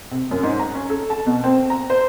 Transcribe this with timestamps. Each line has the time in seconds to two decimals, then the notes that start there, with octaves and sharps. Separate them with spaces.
0.11 C3
0.31 F#2
0.43 G#2
0.59 A#5
0.75 C#4
0.90 A4
1.10 A5
1.26 B2
1.44 C4
1.70 A#5
1.90 C5